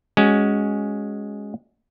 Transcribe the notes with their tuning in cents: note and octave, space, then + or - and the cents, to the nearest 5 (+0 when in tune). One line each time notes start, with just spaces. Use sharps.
G#3 +0 C#4 +0 F#4 +15